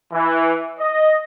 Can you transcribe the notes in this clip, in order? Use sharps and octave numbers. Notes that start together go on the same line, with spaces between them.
E3
D#5